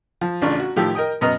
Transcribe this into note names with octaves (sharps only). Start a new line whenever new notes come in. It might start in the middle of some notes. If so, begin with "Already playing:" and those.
F3
A1 C#3 D4 F4 C#6
F#4
A2 D#3 F3 G4 E6
A#4 D#5 G5 D#6
F#2 B2 B3 D#5 A#5 F6